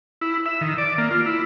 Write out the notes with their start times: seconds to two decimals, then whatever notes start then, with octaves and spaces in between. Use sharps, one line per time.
0.21 E4
0.46 E5
0.61 D#3
0.78 D5
0.98 A#3
1.11 F4
1.26 E4